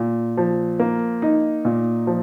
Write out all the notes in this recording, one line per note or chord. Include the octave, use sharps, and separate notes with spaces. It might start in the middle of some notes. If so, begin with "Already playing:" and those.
Already playing: A#2
F3
A#3
D#4
A#2
F3